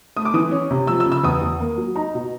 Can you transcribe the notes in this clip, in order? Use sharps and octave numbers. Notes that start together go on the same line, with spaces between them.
A3 D#6
D6
E3 D#6
C#4
C3
F3 E6
E6
C#3
E6
E2 D#6
E2
A#3
F#3
D#4 A#5
B2